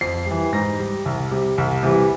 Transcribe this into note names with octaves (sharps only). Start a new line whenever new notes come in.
F2 C7
E3 G3
G#2 A#6
G3
C2
C3 G3
C2
C3 E3 G3